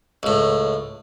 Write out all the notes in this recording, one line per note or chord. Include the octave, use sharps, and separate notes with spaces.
C#2 A2